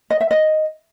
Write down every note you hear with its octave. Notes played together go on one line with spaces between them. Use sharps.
D#5
E5
D#5